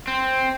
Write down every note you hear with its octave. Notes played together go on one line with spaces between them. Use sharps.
C4